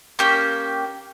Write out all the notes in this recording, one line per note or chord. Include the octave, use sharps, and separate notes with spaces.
A#3 C#4 G4